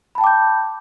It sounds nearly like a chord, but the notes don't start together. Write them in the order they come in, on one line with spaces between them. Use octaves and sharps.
B5 A5 G5 D6 G6